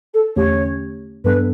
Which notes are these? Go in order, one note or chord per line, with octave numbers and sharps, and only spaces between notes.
A4
E2 D3 A3 C#4 G4 C#5
G2 F#3 B3 D4 A4 B4